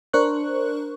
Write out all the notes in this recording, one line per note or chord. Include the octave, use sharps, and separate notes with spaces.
D4 A#4 C5 C#6 F#6